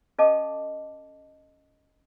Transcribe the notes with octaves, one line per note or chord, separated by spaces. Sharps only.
C#4 A4 D#5 F5 A5 D6